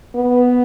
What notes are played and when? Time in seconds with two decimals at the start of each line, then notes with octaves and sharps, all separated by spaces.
0.15 B3